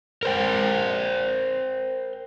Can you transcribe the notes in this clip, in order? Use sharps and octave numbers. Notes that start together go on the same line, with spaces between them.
A#4 C5 G5